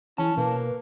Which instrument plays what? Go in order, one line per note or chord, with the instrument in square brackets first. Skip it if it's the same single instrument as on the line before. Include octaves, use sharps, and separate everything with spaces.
[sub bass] E3 [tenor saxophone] C#4 [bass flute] E4 [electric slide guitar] A5
[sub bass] B2 [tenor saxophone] A#3 [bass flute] B4